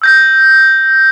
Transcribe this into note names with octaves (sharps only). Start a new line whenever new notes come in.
E6 G6 A#6